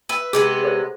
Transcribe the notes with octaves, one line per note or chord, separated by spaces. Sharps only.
B4 E5
C3 G#3 B3 G#4
A4 C5 C#5